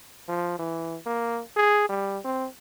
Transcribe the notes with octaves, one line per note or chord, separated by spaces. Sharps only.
F3
E3
A#3
G#4
G3
C4